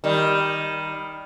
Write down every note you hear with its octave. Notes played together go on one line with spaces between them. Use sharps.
D#3 G3